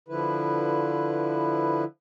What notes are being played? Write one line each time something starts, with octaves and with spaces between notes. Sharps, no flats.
D3 F3 E4 B4